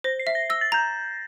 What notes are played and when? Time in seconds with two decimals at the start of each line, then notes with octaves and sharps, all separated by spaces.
0.04 C5 A#6
0.19 C7
0.27 E5
0.35 A#6
0.50 E6 A#6
0.61 A6
0.72 A#5 G6